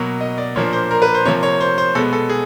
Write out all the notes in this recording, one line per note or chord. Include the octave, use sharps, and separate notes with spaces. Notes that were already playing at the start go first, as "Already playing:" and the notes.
Already playing: B2 F#3 A#3
D#5
D5
A#2 F3 A#3 D4 C#5
C5
A#4
B4
C5
C3 F3 A#3 C#5
C#5
C5
C5
B2 G#3 B3 A4
A4
G#4